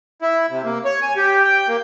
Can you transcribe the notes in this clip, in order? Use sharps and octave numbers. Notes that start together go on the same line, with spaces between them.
E4
C3
A#3
C#5
G#5
G4
G5
A#3